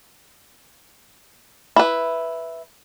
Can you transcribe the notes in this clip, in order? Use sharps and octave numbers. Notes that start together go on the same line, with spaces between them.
E4 B4